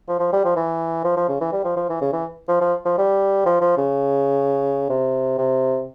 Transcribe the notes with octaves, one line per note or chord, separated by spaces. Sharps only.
F3
F3
G3
F3
E3
F3
F3
C#3
E3
G3
F3
F3
E3
C#3
E3
F3
F3
F3
G3
F3
F3
C#3
C3
C3